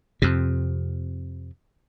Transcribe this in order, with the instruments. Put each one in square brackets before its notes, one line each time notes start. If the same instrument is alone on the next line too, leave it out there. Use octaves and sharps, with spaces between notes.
[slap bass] F2 C3